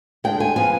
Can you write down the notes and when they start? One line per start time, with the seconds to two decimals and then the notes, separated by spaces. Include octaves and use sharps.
0.24 D2 D3 G#3 G5
0.40 G#5
0.56 F3 B3 G#5